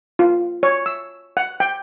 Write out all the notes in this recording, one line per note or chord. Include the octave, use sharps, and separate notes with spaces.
F4
C#5
E6
F#5
G5